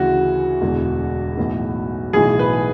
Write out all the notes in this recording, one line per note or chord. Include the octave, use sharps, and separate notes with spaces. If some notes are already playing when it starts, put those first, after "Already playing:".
Already playing: D2 C#3 E3 F#4
E1 E2 D3
B1 A2 E3
B1 A2 E3 G#4
B4